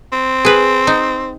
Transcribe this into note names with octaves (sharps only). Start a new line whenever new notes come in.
C4
G#4 B4
D#4